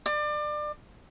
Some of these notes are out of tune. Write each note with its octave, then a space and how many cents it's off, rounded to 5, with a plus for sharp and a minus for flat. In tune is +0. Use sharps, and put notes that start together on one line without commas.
D5 +30